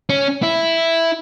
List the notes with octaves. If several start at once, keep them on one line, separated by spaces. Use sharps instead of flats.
C#4
E4